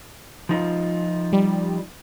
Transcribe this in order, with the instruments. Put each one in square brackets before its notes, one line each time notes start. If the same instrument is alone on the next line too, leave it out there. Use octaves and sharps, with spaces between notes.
[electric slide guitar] F3 D#4 F4
[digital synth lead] G3